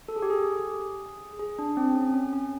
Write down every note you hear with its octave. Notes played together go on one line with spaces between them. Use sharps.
A4
G#4
G4
G#4
G#4
D4
C4
C#4
C#4
C#4